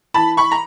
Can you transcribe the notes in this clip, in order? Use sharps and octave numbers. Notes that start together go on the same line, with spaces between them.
E3 A5 B5
B5 C#6
A#5